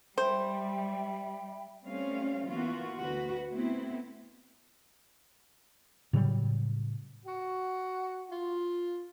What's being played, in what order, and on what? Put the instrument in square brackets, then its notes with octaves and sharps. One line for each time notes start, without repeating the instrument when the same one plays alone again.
[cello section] G3 [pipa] C5 [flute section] E5 G5 B5
[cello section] G3 A3 C4 C#4 F5
E3 A#3 B3 F4 F#4
D2 F#4 B4
A3 B3 C4 E4
[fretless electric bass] A2 C#3 F#3 G3
[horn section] F#4
F4